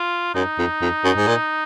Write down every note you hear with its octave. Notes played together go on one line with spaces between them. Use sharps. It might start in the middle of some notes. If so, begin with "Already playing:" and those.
Already playing: F4
F#2 D#4
F2
F2
F#2
G#2
A#2